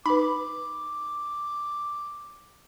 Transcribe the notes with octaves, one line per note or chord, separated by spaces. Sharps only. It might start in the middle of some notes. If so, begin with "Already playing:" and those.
D#4 B4 B5 D6